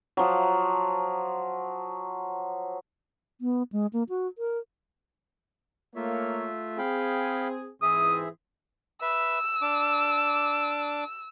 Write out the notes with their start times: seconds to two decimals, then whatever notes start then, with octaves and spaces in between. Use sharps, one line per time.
0.17 F3 F#3
3.41 B3
3.72 G#3
3.93 A#3
4.09 F#4
4.38 A#4
5.96 A3 A#3 F4 C#5 E5
6.78 C4 G#4 F5 G5 B5
7.82 G#2 E3 C4 G#4 E5 D#6
9.02 B4 E5 E6
9.62 D4 D6